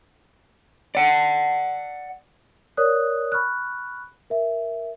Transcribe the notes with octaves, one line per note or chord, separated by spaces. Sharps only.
D5 F#5
A#4 C#5 D5 D#6 F#6
B5 C#6 F6 F#6
A#4 E5